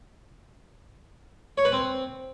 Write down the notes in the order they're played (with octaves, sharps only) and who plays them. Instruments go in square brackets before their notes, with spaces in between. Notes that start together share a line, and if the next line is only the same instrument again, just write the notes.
[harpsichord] C#5
B4
C4